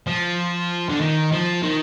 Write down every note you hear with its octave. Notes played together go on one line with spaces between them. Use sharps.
F3
D3
D#3
F3
D#3